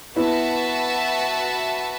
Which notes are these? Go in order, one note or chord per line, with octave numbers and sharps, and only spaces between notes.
B3 E4 F#4 B4 E5 A5